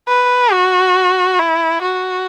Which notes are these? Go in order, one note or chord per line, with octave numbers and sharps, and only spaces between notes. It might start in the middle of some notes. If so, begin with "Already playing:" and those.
B4
F#4
E4
F#4